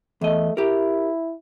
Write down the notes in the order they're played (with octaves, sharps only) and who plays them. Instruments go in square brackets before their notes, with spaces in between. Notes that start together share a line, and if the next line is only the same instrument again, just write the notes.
[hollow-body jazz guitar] E2 D#5 [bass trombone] A3
[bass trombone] E4 [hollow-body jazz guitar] G4 A#4